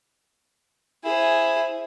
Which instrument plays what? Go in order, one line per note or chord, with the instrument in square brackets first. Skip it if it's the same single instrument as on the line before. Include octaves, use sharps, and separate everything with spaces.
[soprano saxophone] E4 [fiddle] G#4 C5